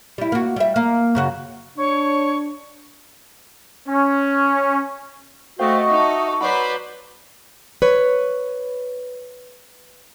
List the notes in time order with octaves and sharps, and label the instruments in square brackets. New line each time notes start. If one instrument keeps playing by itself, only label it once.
[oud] G3 E4
A#3 F#4
G3 E5
A#3
F#2 C#3 F#4
[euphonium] D4 [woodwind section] C#5 [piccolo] C#6
[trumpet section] C#4
[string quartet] A3 [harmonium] F#4 D#5 [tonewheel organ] C5 F5 G5 [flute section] C#6
[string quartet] D#4 A4 [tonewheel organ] E5
[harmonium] F#3 [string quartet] B4 C5 D5 [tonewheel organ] F#5 B5
[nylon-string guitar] B4 C#5